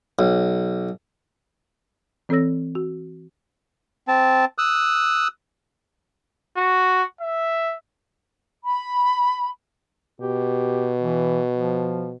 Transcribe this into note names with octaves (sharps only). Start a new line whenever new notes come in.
B1
E3 C4 A4 C#5 E6 A#6
F#4
C4 A5
D#6 E6 F#6
F#4
E5
B5
B2 G4
E3
F3